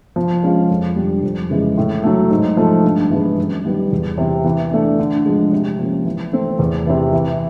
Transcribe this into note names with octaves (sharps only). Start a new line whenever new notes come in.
F3
G#3 C#4 F4
F2
D3 G3
F2
C#3 E3 G#3
A2
F#3 A3
G#2
F3 A3
G2
E3 G#3 B3 E4
F#2
D#3 G3 B3
E2
C3 E3
E3
A3 D4
D3
F3 G#3
C3
F3 A#3 C#4
E3
A3 C4
E2
C3 E3
E3